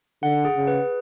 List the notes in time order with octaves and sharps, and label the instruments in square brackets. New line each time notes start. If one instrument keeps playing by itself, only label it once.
[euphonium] D3 [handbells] F#5
[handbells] G#4
[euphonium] C#3
[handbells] B4